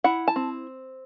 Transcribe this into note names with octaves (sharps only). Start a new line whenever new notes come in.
E4 F#5
A5
C4